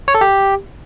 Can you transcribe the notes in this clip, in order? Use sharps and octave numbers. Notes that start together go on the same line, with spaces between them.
C#5
A4
G4